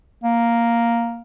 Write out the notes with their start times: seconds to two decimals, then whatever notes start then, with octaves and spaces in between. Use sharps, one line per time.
0.24 A#3